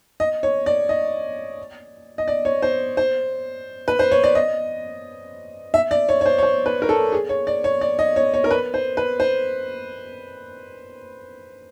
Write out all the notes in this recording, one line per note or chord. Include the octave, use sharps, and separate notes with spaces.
D#5
C#5
D5
D#5
D#5
D5
C#5
C5
C5
B4
C5
C#5
D5
D#5
E5
D5
C#5
C#5
C5
C#5
C5
B4
A#4
A4
G#4
C#5
D5
C#5
D5
D#5
C#5
C#5
A#4
B4
C5
B4
C5